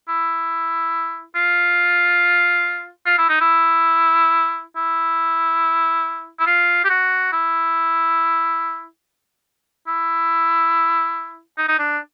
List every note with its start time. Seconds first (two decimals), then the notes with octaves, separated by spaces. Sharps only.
0.08 E4
1.36 F4
3.06 F4
3.18 E4
3.29 D#4
3.41 E4
4.76 E4
6.40 E4
6.47 F4
6.85 G4
6.89 F#4
7.32 E4
9.88 E4
11.58 D#4
11.68 D#4
11.79 D4